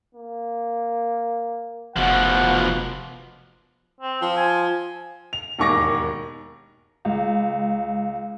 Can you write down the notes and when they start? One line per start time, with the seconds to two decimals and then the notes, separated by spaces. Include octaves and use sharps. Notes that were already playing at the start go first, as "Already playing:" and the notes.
0.15 A#3
1.96 F1 B2 F3 F#5
4.00 C4
4.22 F3 C4
4.37 G#5
5.33 F7
5.59 E1 D#2 G#2 C#6 D6 A#6
7.05 C#2